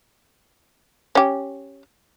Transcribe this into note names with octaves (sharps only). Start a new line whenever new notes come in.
C#4 G4